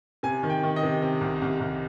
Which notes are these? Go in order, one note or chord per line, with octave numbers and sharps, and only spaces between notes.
C3 G#5
D#3
G5
D#3
D#5
C3
C3
C2
C2
C2